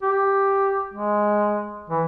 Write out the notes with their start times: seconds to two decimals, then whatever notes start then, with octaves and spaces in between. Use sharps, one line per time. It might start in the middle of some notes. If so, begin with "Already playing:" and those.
0.02 G4
0.94 G#3
1.90 E3